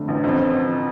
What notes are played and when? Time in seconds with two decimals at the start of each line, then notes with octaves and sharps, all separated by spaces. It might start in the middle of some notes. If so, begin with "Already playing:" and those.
Already playing: F2 D3 A3
0.08 A1
0.24 F2